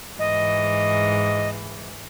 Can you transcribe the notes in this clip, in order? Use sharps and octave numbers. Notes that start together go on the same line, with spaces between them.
G#2 E3 D#5